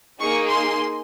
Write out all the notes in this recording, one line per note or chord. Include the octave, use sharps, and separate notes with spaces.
A#3 D#4 G#4 C#6
C6